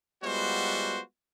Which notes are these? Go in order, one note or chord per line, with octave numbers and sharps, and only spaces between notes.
G3 G#3 B3 F4 F#4 C5